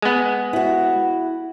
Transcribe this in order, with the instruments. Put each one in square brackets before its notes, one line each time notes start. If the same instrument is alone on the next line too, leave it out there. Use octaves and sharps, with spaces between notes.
[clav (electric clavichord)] G#3 B3
[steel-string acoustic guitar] E4 F#4